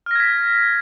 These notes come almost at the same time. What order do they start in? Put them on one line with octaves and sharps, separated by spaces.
F6 A#6 G#6 B6